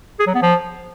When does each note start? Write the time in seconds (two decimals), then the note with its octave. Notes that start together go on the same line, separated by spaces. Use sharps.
0.19 G#4
0.27 F#3
0.35 B3
0.42 F3